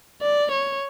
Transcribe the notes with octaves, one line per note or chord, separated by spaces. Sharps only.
D5
C#5